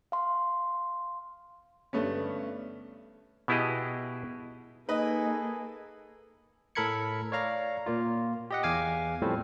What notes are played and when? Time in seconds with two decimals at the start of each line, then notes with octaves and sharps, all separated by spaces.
0.12 F5 C6
1.93 G2 D3 A3 B3 C#4
3.48 B2 B3 E4 G4 G#4 D#5
4.89 A#3 D#4 G#4 A4 B4 D#5
6.75 A2 A4 A#4 B5 G#6 C#7
7.32 C#5 D5 F5 A#5
7.86 A#2 A#3 F4
8.51 G4 D#5 F#5
8.63 E2 F5 G#5 D6
9.22 A2 F3 G3 A3 C4 E4